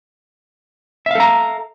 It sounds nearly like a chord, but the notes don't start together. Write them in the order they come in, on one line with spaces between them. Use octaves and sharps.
E5 F5 A4 A#5